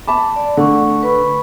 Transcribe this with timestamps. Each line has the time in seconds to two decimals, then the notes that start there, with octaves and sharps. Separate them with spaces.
0.07 A5 B5 D6
0.36 D5
0.57 D3 A3 D4 C#6
1.03 B4 B5 C#6